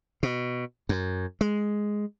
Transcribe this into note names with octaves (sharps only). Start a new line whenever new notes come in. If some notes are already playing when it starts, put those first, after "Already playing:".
B2
F#2
G#3